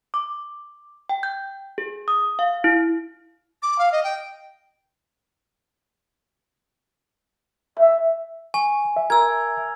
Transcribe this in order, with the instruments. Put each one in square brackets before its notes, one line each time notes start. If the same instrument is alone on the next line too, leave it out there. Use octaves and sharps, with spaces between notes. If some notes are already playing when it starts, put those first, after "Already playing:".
[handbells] D6
G5
G6
G#4
D#6
F5
E4
[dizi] D6
F5
D#5
G5
[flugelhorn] E5
[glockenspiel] G#5 [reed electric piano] C#6
[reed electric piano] E5
[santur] A#4 [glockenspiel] E6 G#6